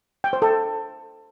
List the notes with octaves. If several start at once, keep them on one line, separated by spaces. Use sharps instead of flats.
G5
C5
A4